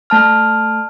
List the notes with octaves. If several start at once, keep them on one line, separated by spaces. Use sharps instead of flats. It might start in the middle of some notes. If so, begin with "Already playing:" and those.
A3 A5 F6